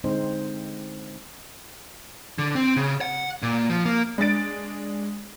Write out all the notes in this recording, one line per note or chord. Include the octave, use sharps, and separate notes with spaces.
D3 G#3 C4 D#4 C5
D3
C4
C#3
F#5
A#2
F3
A#3
G#3 D4 A6 D7